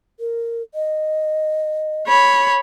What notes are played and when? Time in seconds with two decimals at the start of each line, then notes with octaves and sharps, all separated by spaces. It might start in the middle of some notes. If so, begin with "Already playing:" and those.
0.20 A#4
0.74 D#5
2.07 C#5 B5